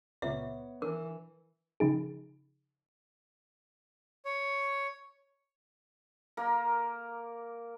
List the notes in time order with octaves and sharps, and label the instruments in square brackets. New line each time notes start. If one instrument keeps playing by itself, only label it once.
[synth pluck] C#2 A#2 C#3 [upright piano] B3 C#5 [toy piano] E5
[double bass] E3 [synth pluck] D4 [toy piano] A#4
[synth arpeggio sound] C#3 F3 D#4 G#4
[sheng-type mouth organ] C#5
[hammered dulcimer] A#3 A#4